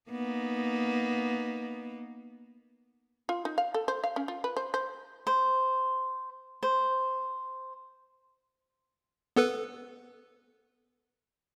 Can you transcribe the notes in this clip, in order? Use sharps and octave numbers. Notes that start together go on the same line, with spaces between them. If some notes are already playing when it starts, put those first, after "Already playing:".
A#3 B3 D#4
F4
D#4
F5
A4
C5
F5
C#4
F4
B4
C5
C5
C5
C5
B3 A4 B4